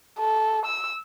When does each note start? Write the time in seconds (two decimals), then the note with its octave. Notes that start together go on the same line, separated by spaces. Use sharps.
0.19 A4
0.66 E6